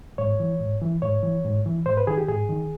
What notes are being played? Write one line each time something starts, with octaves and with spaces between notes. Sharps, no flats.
G#2 C#5
E3
G#2
E3
G#2 C#5
E3
G#2
E3
G#2 C5
B4
D#3 G#4
G4
G#2 G#4
D#3